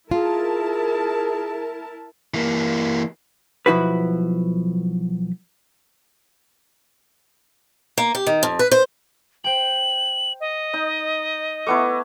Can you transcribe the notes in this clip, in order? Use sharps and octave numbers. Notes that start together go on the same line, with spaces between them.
E4 F4 G#4 A#4 A5
E3 A#3
B1 F3 E4 F#4 B4
A#3
G4
D#3
F2
B4
C5
C5 G5 F#7
D#5
D#4
A3 B3 E4 C#6 D6 C#7